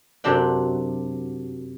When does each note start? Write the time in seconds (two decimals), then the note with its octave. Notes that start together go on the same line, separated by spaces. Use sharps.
0.24 F#2 C3 F#3 D4 G5